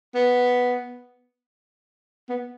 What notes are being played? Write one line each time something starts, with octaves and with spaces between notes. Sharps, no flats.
B3
B3